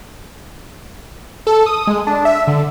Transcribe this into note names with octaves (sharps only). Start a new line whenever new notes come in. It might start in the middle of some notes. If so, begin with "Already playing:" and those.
A4
D#6
G#3
D4
E5
D3